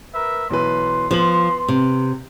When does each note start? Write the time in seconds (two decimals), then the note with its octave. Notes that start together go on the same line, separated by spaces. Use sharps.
0.14 A#4 B4 E5
0.50 B1 E3 B4 C6
1.11 F3 B3 F#7
1.68 C3